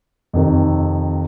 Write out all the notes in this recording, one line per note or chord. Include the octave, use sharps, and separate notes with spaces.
F2 C3 D#3